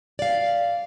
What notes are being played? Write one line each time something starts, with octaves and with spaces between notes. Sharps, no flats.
D5 F5